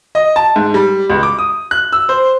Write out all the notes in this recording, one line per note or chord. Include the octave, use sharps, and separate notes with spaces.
D#5
A5
G#2
G3
C#2
D6
D#6
F#6
E6
C5